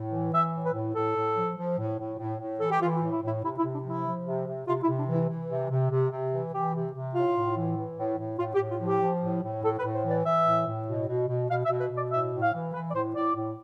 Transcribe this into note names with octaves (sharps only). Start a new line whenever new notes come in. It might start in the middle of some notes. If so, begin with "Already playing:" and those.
Already playing: A2
E3
E3 E5
A2
B4
A2
A2 A4
A2
F3
F3
A2
A2
A2
A2
E3 A4
G4
E3 F4
F4
A2
E4
A2 E4
C3 E4
E4
C3
D4
F3
E4
F3
C3
C3
C3 F4
E4
C3
D4
E3
E4
E3
C3
C3
C3
C3
E3
E3 G4
C3
C3
A2 F4
A2
E3
E3
A2
A2
A2 F4
G4
A2
F4
F3
G4
F3
A2
A2
A2 A4
B4
A2
C5
E3
D5
E3 E5
A2
A2
B2
B2
B2
B2 F5
E5
B2
B4
B2 D5
A2 E5
A2
F5
E3
E3 B4
D5
A2 C5
A2 D5
A2